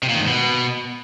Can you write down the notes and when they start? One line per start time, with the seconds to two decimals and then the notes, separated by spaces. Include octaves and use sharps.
0.03 C3
0.09 A#2
0.15 D#3
0.21 G#2
0.27 B2